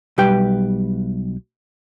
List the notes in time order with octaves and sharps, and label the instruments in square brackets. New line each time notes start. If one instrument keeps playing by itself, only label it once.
[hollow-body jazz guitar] B1 G3 G4 B4 G5